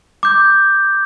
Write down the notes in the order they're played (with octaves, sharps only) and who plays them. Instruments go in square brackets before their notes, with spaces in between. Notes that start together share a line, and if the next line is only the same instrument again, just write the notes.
[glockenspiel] D6 G6